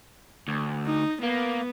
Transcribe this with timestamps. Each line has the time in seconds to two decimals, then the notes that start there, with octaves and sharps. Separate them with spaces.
0.48 D2
0.86 D#4
1.23 A#3 B3